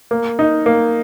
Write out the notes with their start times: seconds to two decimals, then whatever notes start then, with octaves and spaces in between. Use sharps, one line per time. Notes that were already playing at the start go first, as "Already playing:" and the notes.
0.11 A#3
0.39 D#4
0.66 A#3